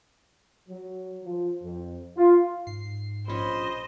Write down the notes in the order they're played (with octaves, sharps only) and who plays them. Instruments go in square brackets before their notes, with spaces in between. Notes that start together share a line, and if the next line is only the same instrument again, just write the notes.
[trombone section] F#3
F3
F2
F4
[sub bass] G#2 [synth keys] C7
[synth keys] A#1 C#4 [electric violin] C5 D#5 [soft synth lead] B5